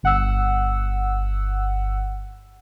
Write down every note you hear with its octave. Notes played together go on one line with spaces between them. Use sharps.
G1 F#5 E6